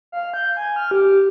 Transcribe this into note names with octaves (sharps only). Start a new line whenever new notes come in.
F5
G6
G#5
F6
G4